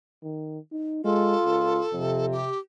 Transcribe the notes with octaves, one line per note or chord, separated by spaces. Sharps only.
D#3
D#4
G#3 F4 A4
C#2
F2 C3
G4